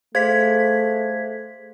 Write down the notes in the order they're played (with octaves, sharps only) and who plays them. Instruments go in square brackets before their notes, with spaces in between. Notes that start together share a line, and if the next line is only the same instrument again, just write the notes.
[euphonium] A3 [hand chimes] G#4 C5 F5 [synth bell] G#6 B6